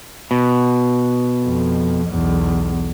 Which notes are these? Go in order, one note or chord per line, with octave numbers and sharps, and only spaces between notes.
B2
F2
B1 E2